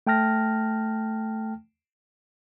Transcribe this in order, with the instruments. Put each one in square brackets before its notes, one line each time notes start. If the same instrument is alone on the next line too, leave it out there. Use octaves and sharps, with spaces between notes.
[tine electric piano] A3 G5 A5 F6 A#6